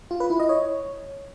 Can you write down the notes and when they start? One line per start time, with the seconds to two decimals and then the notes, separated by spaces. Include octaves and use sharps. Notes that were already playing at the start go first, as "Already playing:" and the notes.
0.11 F4
0.20 B4
0.30 E4
0.39 D#5
0.49 C#5